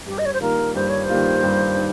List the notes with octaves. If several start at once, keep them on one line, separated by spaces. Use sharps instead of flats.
G2 G4
D#5
C#5
C5
D#3 G3 A#3 F4 A#4
G2 C5
C#5
C5
D#3 G3 A#3 F4
G2
D#3